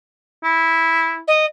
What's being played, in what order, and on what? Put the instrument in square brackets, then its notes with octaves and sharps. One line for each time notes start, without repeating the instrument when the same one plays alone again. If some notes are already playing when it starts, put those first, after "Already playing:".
[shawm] E4
[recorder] D#5